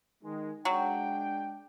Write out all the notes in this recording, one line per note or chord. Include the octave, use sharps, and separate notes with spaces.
D#3 G#3
F#3 G#3 D4 G5